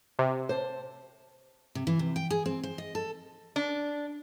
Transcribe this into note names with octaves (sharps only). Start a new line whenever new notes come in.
C3
C5 A5
C3
E3
C3
G5
G#4
C4
C5
D#5
A4
D4